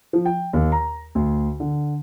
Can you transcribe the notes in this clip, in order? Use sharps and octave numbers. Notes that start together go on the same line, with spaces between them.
F3
G5
D#2
A#5
D2
D3